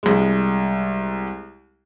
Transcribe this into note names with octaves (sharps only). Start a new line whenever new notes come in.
C2 G#3